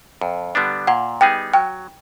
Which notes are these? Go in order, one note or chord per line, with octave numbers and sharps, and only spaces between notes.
F2
D3 G3 B3 D4
A#2 F#5
G3 B3 D#4 G#4 G5
F#3 G5